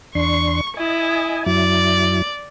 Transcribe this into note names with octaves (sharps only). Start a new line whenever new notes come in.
E2 D4 C6 C#6
E4 D#5 G#5
F#2 F#3 E4 D5